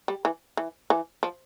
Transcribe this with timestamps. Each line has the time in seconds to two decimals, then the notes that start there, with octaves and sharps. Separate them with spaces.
0.08 G3
0.25 E3
0.57 E3
0.90 E3
1.23 F3